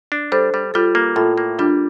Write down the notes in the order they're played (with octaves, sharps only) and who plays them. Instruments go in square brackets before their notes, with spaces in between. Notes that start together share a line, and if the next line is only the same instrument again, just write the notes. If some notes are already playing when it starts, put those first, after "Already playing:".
[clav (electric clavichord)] D4
[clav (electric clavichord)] G3 [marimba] A4 C5
[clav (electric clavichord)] G3
[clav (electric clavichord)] G3 [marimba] F4 A4
[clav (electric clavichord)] A#3
[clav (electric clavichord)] A2 [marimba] F4 A4
[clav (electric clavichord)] A#3
[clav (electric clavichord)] G3 [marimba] D4 F4